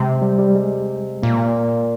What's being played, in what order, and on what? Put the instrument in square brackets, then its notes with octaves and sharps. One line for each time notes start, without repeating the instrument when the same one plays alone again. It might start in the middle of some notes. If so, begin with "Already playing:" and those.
Already playing: [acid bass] C3 [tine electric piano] G#3
[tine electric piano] G3
G3
G#3
[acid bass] A#2 [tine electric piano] A#3